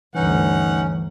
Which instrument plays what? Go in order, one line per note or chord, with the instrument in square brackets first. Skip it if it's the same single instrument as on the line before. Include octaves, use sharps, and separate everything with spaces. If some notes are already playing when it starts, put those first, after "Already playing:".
[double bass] D2 G2 [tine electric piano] E3 [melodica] C#4 [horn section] D#4 F#5